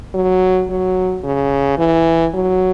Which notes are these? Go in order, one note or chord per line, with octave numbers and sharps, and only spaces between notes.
F#3
F#3
C#3
E3
F#3